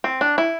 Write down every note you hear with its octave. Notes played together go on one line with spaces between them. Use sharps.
C4
D4
E4